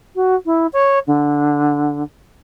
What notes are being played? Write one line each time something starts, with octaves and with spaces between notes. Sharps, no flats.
F#4
E4
C#5
D3